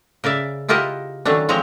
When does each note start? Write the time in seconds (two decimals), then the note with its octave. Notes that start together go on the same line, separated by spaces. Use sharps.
0.24 C#3 A#4 D5 E5
0.69 E4 F4 G4 A#4 D#5 F#5
1.25 D#3 F#3 A3 C#4 D4
1.49 F3 G#3 C4 C#5 A#5